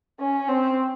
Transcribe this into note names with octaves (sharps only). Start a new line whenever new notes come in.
C#4
C4